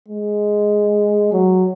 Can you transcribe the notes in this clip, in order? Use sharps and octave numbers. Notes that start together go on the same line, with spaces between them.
G#3
F#3